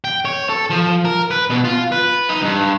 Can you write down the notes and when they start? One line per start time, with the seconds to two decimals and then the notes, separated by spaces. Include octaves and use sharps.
0.04 G5
0.25 C#5
0.49 A4
0.70 F3
1.05 A#4
1.31 B4
1.50 B2
1.65 F4
1.92 B4
2.29 D#4
2.42 G2